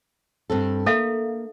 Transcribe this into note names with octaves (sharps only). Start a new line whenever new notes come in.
G2 C4 A4
A#3 A4 E5 F5